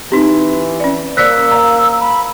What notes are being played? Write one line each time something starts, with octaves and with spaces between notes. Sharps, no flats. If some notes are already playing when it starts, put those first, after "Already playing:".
E3 C4 D#4 G4
C#4 D5
A#3 C5 D5 E6 F#6 B6
F5 A#5
B5